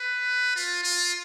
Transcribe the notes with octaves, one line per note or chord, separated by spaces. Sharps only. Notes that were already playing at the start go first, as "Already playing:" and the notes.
Already playing: B4
F4
F4